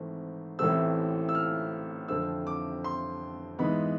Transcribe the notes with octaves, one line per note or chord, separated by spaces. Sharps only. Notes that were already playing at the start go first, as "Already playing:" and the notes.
Already playing: G#1 G#2 E3 A3 C4
A1 A2 E3 A3 C4 E6
E6
F6
F2 D3 A3 C4 E6
D6
C6
G#2 E3 G#3 B3 B5